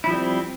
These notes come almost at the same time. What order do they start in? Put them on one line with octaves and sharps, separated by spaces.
E4 F3 G3 C4